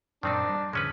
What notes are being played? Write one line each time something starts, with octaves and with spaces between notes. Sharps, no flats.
F#2 A#2 D#3 C4 D4 D#4
G3
A1 F2 D3 G#3 C#4 B4